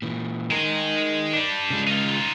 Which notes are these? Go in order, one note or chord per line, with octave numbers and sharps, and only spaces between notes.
A#2 E3
G#3 D#4 A#4 D#5
G3 D4
C#3 G#3
D#4 F4